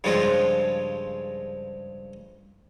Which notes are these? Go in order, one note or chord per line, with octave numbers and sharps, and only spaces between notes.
G2 C#3 F3 G#3 C4